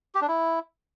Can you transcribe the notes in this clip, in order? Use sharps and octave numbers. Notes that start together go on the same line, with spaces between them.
G4
D4
E4